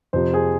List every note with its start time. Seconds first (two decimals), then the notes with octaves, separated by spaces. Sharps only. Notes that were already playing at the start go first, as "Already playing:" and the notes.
0.13 F2 C3 F3 C5
0.34 G#4